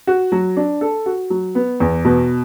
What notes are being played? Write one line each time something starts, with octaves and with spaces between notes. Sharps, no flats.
F#4
F#3
D4
A4
F#4
F#3
B3
E2
B2